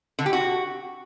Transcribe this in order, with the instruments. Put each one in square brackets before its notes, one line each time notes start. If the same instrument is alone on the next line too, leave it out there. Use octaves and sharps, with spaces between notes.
[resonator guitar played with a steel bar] D3
G4
F#4